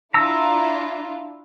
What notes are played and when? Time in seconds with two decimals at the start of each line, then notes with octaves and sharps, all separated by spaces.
0.14 D4 E4 F4 A#5 E6